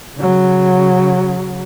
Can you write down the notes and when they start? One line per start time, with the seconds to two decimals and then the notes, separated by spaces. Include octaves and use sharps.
0.16 C#3 F#3